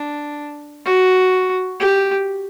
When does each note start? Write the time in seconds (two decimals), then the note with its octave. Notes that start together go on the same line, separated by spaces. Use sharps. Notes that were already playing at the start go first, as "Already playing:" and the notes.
Already playing: D4
0.85 F#4
1.80 G4